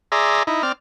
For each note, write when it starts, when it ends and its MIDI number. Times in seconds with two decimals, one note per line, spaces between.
0.12 0.43 68
0.12 0.43 74
0.12 0.43 76
0.12 0.43 82
0.12 0.43 84
0.47 0.62 63
0.47 0.62 64
0.63 0.72 60
0.63 0.72 74
0.63 0.72 89